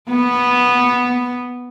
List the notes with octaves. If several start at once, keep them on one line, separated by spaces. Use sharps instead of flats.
B3